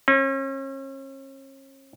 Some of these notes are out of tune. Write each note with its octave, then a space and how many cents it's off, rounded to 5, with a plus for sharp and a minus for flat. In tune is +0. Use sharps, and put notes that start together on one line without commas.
C#4 -40